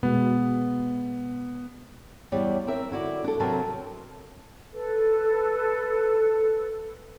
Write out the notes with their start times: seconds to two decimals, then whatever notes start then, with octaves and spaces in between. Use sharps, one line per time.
0.03 B2 G#3 B3
2.32 E2 G3 C#5 D5
2.67 C4 A#4 E5
2.91 D3 E4 F#4 D5
3.24 D4 A4
3.40 C3 F#3 C4 A#4 B4 A5
4.74 A4 B4